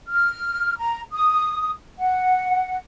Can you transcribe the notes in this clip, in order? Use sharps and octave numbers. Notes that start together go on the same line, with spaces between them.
F6
A#5
D#6
F#5